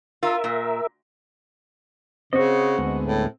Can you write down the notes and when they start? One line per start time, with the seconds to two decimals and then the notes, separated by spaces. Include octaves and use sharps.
0.23 F4 A#4 E5
0.44 A#2
2.33 C#3 C4 F#4 D#5
2.78 D2 G#3 B3
3.05 A2